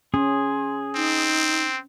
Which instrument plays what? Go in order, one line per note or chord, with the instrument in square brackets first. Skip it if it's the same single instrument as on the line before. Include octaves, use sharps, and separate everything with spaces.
[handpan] C#4 [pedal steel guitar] G#4 [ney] C6
[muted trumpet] C4 [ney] D#4